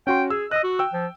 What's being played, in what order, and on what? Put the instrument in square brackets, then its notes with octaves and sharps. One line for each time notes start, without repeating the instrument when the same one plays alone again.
[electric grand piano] C#4 F#4 C6 [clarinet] G5
[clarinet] G#4 [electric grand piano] E6
[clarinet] D#5 [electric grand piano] E6 F#6
[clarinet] F#4
[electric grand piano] G5 E6
[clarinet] F3